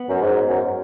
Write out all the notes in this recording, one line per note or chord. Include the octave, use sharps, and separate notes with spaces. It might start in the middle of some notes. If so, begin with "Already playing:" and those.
Already playing: B3
F#2
G#2
F#2